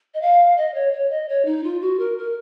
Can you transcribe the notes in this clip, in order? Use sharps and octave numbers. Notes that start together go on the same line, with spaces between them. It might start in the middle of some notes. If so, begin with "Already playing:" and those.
D#5
F5
D#5
C#5
C#5
D#5
C#5
D#4
F4
F#4
A#4
A#4